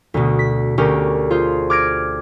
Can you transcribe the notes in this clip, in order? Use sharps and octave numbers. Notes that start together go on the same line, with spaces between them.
D2 B2
B6
D2 C#4 G4 A#4
F4 G#4 C5
D6 F6 G#6 A#6 D7